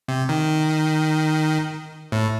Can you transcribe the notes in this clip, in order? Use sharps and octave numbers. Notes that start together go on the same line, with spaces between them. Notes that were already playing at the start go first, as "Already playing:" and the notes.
C3
D#3
A2